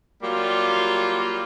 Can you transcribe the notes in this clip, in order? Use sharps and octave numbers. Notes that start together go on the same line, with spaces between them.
F#3 G3 A#3 F4